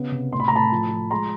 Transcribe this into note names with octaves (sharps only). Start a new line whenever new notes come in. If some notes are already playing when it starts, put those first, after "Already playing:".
Already playing: C#3 B3
C3
A2 C6
B5
A#5
A2 A5 B5
F3
F3
G#3 A#5 C6